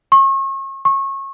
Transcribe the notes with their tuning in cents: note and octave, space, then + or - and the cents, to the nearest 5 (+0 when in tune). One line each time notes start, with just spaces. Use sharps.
C#6 -35
C#6 -25